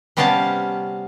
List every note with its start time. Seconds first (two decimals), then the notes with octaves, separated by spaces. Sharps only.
0.17 C3 G3 B3 C#4 F5 A5